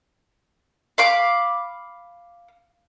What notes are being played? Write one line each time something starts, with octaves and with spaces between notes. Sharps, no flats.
F5 B5 D6